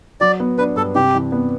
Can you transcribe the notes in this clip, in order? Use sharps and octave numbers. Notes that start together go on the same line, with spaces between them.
F#3 D5
B3
D4 B4
G2 A4
C3 G4
E3
B3